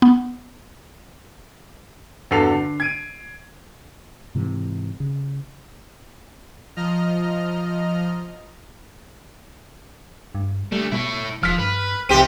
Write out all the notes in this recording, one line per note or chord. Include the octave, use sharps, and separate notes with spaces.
B3
E2 G2 F#4 A4 C7 F7
D3
G#6 D7 D#7
G#2 C3 E3
C#3
F3 D#5 A#5 F6
G2
D2 G3 A3
B2 E4 C#5
E1 F3 F6 B6
G2 B4
F1 C2 C4 G4 D#7